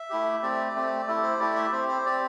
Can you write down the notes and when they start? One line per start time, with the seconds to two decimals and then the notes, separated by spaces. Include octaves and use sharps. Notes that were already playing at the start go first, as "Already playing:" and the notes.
Already playing: E5
0.10 A3 E4 G4
0.43 A3 C4 G4 D5
0.75 A3 C4 G4
1.07 A3 E4 G4 A4
1.23 C5
1.39 A3 E4 G4 D5
1.56 E5
1.72 C4 G4 C5
1.89 C5
2.05 C4 G4 D5